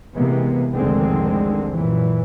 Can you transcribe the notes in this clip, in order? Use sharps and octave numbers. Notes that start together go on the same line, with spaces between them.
C3 E3 G#3 A#3 B3
F1 C2 D3 D#3 G#3 C4
F#2 A#2 E3